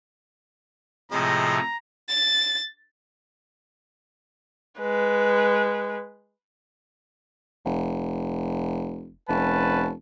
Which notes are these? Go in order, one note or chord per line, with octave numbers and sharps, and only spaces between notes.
A2 C3 F3 G#3 D#5 A#5
A6
G#3 B4
F1
F1 C#4 B4 A5